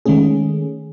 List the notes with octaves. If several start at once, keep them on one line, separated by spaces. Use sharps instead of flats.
D#3 G#3 A3 C#4 G#4